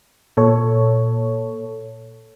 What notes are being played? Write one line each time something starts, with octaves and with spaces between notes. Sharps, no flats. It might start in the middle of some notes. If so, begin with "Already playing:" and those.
A#2 A4 C#5